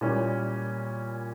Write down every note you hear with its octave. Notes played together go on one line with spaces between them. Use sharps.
A#2 G3 A#3 C#4 E4